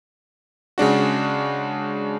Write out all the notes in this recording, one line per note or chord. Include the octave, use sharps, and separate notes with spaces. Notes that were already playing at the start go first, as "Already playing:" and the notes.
C#3 G#3 D4 F#4